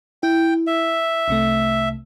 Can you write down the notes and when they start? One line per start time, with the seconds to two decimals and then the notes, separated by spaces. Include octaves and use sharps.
0.23 E4 G5
0.67 E5
1.28 C2 C3 A3